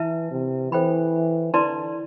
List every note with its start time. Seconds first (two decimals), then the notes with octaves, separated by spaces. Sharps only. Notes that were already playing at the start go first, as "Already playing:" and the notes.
Already playing: E3 E4 B4 E5 A5
0.31 C3
0.72 E3 A4 C5 G5 B5
1.54 D3 E4 B4 D5 A5 C6